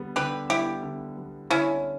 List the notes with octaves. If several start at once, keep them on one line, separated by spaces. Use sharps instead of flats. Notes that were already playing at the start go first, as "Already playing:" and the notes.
Already playing: D3 G3 B3
D3 G4 B4
G3 B3 E4 G4
D3
G3 B3
D3 C#4 E4